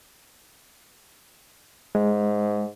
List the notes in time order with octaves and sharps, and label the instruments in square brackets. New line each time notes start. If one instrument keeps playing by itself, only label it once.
[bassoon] G#2 [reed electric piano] G#3